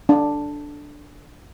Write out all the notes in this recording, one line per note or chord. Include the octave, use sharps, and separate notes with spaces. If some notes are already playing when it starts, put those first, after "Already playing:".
D4